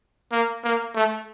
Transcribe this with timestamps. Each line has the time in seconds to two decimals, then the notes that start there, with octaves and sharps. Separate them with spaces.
0.32 A#3
0.64 A#3
0.95 A3